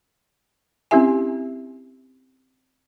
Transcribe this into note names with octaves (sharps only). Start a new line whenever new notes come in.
C4 C#4 E4 G4 E5 G#5